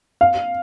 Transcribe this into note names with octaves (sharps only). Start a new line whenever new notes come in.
F5